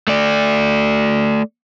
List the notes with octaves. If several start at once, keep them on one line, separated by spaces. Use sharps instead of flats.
A3 D5